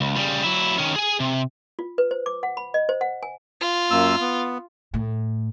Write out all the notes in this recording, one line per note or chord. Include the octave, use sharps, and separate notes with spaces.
C#2
C#3 G3
F#3 E4
D#3 C#4
G#4 G#5
C3
F4
B4
C5
D6
F#5
B5
D#5
C5
F#5
G#5
F4
F#2 A#3 E6
B3
A2